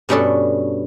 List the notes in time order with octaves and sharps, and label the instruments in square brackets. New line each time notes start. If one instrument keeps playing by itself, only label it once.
[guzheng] G2 B2 C#4 D4 A4